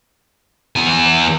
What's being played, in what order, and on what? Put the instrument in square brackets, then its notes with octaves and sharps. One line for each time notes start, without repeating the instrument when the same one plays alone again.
[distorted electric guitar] E2 G#5